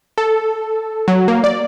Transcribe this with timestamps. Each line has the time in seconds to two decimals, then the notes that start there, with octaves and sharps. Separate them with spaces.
0.18 A4
1.08 F#3
1.28 A#3
1.44 D5